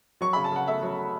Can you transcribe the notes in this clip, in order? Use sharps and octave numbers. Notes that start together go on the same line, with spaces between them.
F#3 C#6
C#3 B5
A5
C#3 F#5
A3 E5
F#3